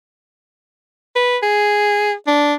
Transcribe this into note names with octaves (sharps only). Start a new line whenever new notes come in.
B4
G#4
D4